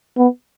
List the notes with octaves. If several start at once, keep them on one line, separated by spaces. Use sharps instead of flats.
B3